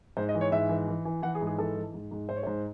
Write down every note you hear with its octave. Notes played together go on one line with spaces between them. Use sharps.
G#2 C5
D#5
E3
C#5
G#2 E5
E3
E3
E3
E3 F#5
G#4
G#2
G#4
E3 A4
E3
G#2
G#2
G#2 C5
C#5
G#2 C5